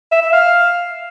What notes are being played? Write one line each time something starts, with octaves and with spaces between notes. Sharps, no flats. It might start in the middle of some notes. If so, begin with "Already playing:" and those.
E5
E5
F5